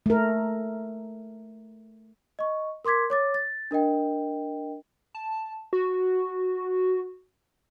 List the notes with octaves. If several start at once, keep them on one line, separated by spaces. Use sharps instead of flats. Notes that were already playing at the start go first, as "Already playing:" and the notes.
A3 A#4
D#5 C#6
A#4 C6 D6 G#6 B6
C#5 D6 A6
A6
D4 A#4 D#5 G5
A5
F#4